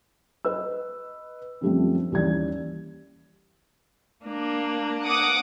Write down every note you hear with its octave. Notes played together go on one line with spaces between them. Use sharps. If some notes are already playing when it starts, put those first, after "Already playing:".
B4 D#5 E6
F#2 D3 F3 G3 A3 C4
D#2 E3 G3 C#4 D5 G#6
A#3 D4
F#5 D6 D#6